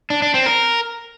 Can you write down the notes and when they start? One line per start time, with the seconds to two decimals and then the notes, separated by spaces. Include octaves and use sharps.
0.10 D4
0.22 D4
0.34 C4
0.46 A#4